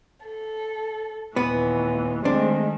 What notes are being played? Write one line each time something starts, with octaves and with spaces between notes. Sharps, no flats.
A4
D#2 A#2 E3 B3 B4
D#3 G#3 A3 C4 D4